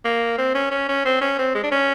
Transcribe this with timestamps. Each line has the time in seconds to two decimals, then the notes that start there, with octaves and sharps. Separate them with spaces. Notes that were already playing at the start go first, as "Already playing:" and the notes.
0.05 A#3
0.38 C4
0.55 C#4
0.71 C#4
0.89 C#4
1.05 C4
1.21 C#4
1.39 C4
1.55 G#3
1.64 D4
1.72 C#4